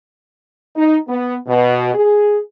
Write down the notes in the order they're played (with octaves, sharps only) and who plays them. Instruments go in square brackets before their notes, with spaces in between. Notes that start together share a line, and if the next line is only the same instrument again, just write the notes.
[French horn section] D#4
B3
B2
G#4